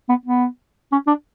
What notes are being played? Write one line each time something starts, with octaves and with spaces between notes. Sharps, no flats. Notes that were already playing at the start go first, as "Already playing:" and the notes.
B3
B3
C#4
D4